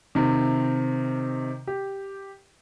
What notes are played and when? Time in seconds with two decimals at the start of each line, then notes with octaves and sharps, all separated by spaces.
0.15 C3 D#3
1.67 G4